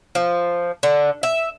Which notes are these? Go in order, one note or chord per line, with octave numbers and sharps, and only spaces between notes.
F3
D3
E5